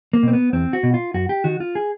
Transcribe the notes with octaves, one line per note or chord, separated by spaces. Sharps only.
A#3
B2 C4
B3
E2 C4
F#4
B2
F4
F#2 F#4
G4
D#3 F#4
F4
G#4